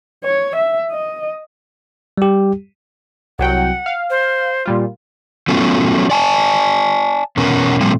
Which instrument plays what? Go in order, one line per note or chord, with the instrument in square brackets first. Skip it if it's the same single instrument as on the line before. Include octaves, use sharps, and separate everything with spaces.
[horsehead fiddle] C#5
E5
D#5
[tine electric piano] G3 G4
[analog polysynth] C2 F#3 G5 [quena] F#5
[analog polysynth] F5
[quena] C5
[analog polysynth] A#2 G3 F4
[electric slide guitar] F#3 A3 B3 C#4 F4
D5 G#5 A5
E2 B2 B3 C#4 A#4
A#2 F3 G3 A3 A#3 C4